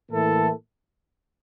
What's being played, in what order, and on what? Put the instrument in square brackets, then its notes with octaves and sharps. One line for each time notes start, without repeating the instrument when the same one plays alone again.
[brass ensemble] A2 E3 A#3 E4 A4